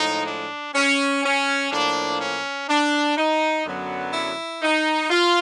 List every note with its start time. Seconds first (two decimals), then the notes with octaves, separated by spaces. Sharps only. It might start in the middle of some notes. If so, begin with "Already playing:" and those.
Already playing: A2 F3 G#3 D#4
0.26 D4
0.74 C#4
1.23 C#4
1.71 A2 F3 A#3 D4
2.20 C#4
2.69 D4
3.17 D#4
3.66 F#2 D3 F#3 B3
4.13 E4
4.62 D#4
5.10 F4